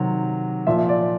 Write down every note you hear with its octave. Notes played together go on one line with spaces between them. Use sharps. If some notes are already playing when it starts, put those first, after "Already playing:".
Already playing: C3 D#3 F#3
A#2 F3 E5
D5